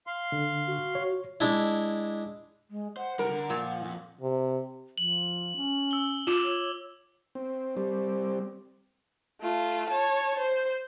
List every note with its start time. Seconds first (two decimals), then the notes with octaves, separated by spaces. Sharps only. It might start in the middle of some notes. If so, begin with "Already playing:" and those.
0.07 F5 C6
0.32 D3
0.67 F#4
0.95 C#5
1.40 G#3 D4 E4
2.70 G#3
2.97 C5 F#5
3.19 C3 G3 A#4
3.31 D3
3.50 A#2 F3 F4
3.83 F2
4.21 C3
4.98 F3 F#7
5.56 C#4
5.91 E6 G7
6.27 F4 D6 E7
6.44 C#5
7.35 C4
7.77 G3 C4
9.41 A3 F4
9.90 C#5 A5
10.39 C5